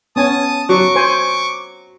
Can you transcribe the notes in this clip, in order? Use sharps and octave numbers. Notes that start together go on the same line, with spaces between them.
B3 C#4 G#5 A5 D#6
F#3 C#6 D6
C5 G#5